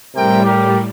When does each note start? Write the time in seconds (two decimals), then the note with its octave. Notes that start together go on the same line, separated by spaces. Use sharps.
0.14 A2 C3 G3 A#4 G5
0.44 G4 A#4